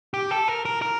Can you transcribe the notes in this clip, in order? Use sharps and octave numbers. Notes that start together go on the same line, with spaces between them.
G4
A4
A#4
A#4
A#4